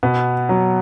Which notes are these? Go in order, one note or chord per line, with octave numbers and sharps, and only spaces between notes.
B2 B3
F#3